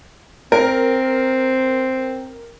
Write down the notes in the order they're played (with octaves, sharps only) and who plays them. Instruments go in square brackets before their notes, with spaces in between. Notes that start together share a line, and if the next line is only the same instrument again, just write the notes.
[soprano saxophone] C4 [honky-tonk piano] A#4